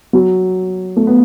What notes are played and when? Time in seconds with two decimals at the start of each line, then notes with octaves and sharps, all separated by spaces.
0.13 F#3
0.96 A3
1.07 B3